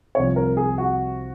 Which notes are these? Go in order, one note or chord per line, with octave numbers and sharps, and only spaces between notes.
C2 C3 F3 C#5
A#4
G#4
F#4